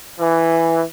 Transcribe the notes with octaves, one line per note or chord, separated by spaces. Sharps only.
E3